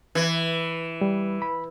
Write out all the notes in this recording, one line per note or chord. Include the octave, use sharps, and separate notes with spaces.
E3
G3
B5